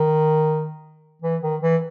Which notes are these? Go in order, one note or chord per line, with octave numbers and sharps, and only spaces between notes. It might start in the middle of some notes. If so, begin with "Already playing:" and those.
Already playing: D#3
E3
D#3
E3